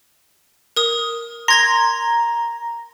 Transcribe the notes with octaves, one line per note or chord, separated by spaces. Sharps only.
A#4 D#6
A#5 C6 G#6 A#6